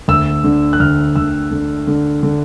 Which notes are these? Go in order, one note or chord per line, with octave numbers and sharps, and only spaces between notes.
D2 E6
D3
F#6
D2 F6
D2 E6
D3
D3
D3